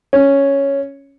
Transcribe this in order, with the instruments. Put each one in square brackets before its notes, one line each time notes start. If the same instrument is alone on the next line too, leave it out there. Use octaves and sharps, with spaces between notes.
[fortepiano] C#4